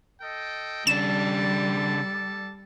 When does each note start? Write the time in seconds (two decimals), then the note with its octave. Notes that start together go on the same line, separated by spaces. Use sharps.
0.22 A4 D#5 G5
0.87 C#3 G3 D4 A4 D5 A5 E7